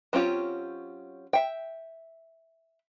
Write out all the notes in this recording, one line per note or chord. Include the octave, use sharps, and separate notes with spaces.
F#3 C4 C#4 F4 G4
E5 G5